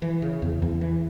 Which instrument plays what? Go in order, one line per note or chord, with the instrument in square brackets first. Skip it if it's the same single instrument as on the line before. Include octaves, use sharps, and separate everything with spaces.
[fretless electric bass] E3
C#3
E2
E2
E3